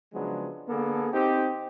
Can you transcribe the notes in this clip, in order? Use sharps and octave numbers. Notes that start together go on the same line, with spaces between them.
C#3 F3 F#3 G#3 B3 D4
D3 A#3 B3 G#4 A4
C4 D#4 G4